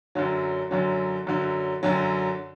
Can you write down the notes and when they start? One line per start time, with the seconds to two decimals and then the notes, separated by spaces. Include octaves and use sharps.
0.15 F#2 D3 F#3
0.71 F#2 D3 F#3
1.27 F#2 D3 F#3
1.83 F#2 D3 F#3